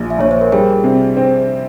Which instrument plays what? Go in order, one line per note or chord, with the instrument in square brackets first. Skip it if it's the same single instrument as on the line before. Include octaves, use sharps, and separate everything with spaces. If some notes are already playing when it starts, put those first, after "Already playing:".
Already playing: [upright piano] A#1 A#2
[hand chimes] E5
[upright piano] A#1 [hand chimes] C#5
[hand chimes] C5
A#4
[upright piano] G3 [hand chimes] G#4
[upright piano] C3
C4